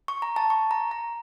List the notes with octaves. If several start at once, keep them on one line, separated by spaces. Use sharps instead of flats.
C#6
A#5
A5
C#6
A#5
A#5